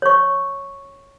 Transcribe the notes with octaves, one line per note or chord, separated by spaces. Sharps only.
C#5 C#6